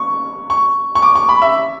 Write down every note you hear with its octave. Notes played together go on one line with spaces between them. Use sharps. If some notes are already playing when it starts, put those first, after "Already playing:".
Already playing: C#6
C#6
C#6
D6
C#6
B5
E5